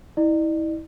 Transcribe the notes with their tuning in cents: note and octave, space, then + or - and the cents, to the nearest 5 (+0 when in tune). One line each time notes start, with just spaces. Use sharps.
E4 -35 D5 +40